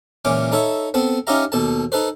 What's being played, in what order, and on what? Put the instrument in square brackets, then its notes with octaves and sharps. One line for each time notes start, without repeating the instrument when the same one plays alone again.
[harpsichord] C#2 A#2 E3 C#4 D6
D#4 A4 C#5 E5
B3 C4 A4
C#4 D#4 F4 G4 E5 A#5
D#2 B2 A4 A5
D#4 A4 B4 C5